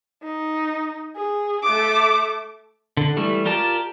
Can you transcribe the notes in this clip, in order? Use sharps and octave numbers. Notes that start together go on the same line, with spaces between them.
D#4
G#4
A3 D6
D3
E3 G3 A3
F4 G4 A#4 D5 A5